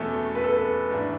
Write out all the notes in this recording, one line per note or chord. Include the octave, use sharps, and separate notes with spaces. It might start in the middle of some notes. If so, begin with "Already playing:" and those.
Already playing: E2 B2 A3 C#4 A4
B4
A4
B4
G#2 E3 A3 D4